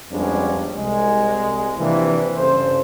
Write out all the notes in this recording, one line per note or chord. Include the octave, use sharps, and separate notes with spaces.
F2 G3 G#3 B3 C#4 D4
C2 G#3
C3 E3 F3 A#3 D4 E4
G2 C#3 A4 C5